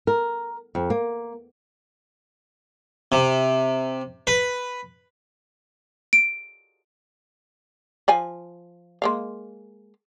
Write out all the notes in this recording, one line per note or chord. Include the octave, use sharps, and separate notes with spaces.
A#4
F2
A#3
C3
B4
D7
F3 F5 G#5
G#3 A#3 F5